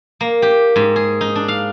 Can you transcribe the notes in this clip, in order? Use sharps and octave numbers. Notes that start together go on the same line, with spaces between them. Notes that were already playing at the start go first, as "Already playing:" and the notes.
A#3
G4
G#2
G#4
D#4
D4
F5